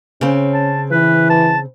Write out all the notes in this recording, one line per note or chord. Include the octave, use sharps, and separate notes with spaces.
C#3 C4 C#4
A5
E3 B4
A5